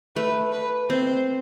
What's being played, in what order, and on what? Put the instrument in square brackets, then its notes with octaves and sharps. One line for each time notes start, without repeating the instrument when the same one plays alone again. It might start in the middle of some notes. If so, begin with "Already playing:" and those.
[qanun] A3 [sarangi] B4
[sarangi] B4
[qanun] C4 [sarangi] C5